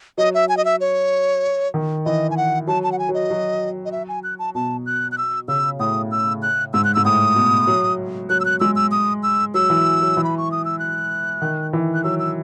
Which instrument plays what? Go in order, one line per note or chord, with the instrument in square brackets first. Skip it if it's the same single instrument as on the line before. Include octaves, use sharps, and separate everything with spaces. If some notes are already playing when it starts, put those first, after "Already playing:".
[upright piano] F#3 [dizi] D#5
[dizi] E5
G#5
D#5
E5
C#5
[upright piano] D#3
[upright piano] E3 [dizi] D#5
[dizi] G#5
F#5
[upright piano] F#3 [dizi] A5
[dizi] A5
F#5
G#5
[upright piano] F#3
[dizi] D#5
[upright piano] F#3
[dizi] D#5
E5
G#5
F#6
A5
[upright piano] B2 [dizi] A5
[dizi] F#6
F#6
E6
[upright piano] C#3 [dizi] E6
[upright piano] A2 [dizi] D#6
[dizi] E6
F#6
[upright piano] G#2 [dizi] E6
[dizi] F#6
[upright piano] G#2 [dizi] E6
[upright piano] A2 [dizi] D#6
[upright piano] B2
F#3
[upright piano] F#3 [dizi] F#6
[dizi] E6
F#6
[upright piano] G#3 [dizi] E6
[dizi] E6
D#6
E6
[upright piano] F#3 [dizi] E6
[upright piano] E3
F#3
E3
[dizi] B5
C#6
D#6
E6
F#6
[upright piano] D#3
E3
[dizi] F#6
[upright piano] F#3 [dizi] E6
[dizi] E6